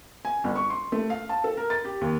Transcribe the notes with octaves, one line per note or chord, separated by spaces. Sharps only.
G#5
G1
C#6
C6
A3
F5
A5
A4
A#4
A6
G4
D#2